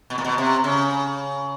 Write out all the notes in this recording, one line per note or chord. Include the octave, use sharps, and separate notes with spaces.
B2
A#2
B2
C3
C#3